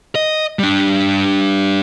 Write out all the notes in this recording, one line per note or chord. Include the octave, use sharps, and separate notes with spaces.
D#5
G3 D4